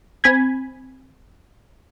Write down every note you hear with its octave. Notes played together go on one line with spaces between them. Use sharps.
C4 G#5 B5 G#6